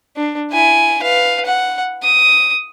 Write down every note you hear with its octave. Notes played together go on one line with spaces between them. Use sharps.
D4
E4 G#5
B4 F5
F#5
D#6